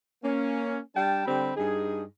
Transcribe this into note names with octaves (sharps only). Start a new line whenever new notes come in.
A#3 C#4
G3 D4 G5 A5
D3 G3 C4 G4 B5
G2 D#4 G#4